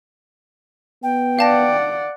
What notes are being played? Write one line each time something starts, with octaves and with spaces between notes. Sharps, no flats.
B3 G5
D5 F5 F#5 A5 A#6